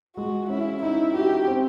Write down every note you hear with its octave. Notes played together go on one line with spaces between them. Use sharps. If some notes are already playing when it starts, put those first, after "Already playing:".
G#3 F#4
C#4 E4
D#4 E4
F#4 G4
C4